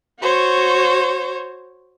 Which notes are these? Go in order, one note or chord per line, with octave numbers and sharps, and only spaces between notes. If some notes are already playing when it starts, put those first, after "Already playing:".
F#4 C5 C#5